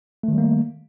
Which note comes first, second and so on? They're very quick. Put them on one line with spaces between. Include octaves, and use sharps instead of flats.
A3 D#3 G3 A#3